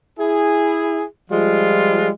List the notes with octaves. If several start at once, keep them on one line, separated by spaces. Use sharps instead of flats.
E4 G#4
F3 G3 G#3 F4